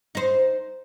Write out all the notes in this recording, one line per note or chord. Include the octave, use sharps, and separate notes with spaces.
D#4 C5